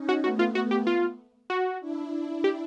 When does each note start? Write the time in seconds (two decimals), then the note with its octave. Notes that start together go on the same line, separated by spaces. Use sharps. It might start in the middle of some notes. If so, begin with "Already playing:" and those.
Already playing: C#4 D#4
0.09 F#4
0.24 A3 B3 F#4
0.39 F4
0.55 F#4
0.71 G4
0.87 F4
1.50 F#4
1.81 D4 E4
2.44 G4